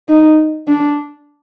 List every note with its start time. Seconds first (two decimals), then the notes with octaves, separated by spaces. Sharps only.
0.09 D#4
0.68 D4